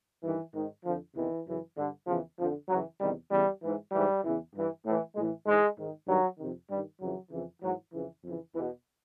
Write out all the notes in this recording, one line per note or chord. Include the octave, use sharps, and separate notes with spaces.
G2 D#3 E3
G#2 D#3
F2 D3 F3
E2 C3 D#3 E3
F#2 C#3 E3
G2 D3
E2 C#3 E3 F3
F2 D3 F3
F#2 C#3 E3 F#3
E2 C3 D#3 G3
E2 C#3 E3 G3
G#2 E3
G#2 E3 G3
E2 C#3 E3
G2 E3
A2 E3
A2 E3 G#3
G#2 E3 G#3
G#2 D#3
G2 D#3 F#3
F2 C3 D#3
G2 D#3 G3
F2 C#3 E3 F#3
F2 C#3 E3
G#2 E3 F#3
F2 C#3 E3
F2 C#3 E3
E2 B2 E3